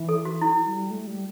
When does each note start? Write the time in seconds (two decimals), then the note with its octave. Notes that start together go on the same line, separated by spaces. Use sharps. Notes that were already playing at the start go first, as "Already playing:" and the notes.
Already playing: E3
0.09 A4
0.25 F#4
0.42 E4
0.66 G3
0.91 A3
1.07 G3